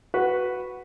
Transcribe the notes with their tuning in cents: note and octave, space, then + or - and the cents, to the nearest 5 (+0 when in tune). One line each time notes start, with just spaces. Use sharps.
F#4 +0 B4 +0